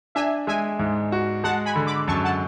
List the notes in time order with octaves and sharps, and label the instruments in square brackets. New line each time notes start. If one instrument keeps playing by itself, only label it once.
[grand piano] D4 [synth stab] E5 G#5
[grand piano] G#3 [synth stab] E5 G#5
[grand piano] G#2
F#4
[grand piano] G#3 [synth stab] F#5 A5
[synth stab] G#5 B5
[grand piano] D3
[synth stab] B5 D6
[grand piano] F#2 [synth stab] A5 C#6
[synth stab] F#5 A5